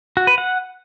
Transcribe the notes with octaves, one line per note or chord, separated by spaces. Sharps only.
F#4
B4
F#5